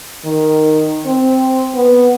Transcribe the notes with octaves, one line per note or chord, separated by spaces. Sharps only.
D#3
C4
B3